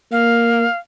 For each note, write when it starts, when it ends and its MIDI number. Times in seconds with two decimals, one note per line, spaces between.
0.12 0.66 58
0.12 0.77 77